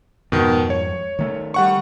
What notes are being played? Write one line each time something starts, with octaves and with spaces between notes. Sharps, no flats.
F2 G#2 B2 D#3
C#5
D#3 A3
G3 F#5 C#6